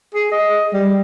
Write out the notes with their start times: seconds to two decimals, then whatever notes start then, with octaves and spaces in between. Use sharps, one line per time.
0.15 G#4
0.32 D#5
0.73 G3